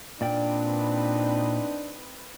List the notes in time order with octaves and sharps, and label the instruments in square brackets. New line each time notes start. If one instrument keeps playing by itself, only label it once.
[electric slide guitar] A#2 D5 G5 [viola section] C4 D#4 B4 [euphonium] D4